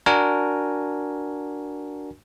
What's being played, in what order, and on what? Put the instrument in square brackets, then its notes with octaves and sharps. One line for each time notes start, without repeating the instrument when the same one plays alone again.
[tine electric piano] D4 F#4 A#4 G#5